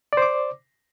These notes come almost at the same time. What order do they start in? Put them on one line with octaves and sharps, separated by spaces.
D5 C5 D6